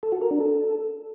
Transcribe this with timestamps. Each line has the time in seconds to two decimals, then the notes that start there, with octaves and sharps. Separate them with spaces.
0.03 A4
0.12 F#4
0.22 A#4
0.31 D4
0.40 A4